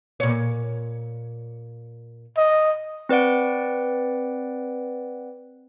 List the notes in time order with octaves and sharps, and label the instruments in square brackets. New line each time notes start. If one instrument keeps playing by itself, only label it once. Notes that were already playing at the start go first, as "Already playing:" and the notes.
[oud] A#2 C#5
[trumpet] D#5
[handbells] C4 B4 D5 F#5 D7